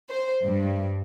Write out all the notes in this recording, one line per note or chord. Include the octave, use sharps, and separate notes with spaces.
C5
G2